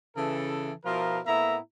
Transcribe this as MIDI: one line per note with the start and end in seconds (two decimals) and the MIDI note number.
0.17 0.72 49
0.17 0.72 52
0.17 0.72 69
0.85 1.20 47
0.85 1.20 53
0.85 1.20 64
0.85 1.20 65
0.85 1.20 70
1.26 1.57 45
1.26 1.57 58
1.26 1.57 59
1.26 1.57 64
1.26 1.57 76
1.26 1.57 82